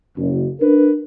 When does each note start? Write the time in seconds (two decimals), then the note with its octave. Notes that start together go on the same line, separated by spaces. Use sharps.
0.17 F#1
0.60 D4 A#4 B4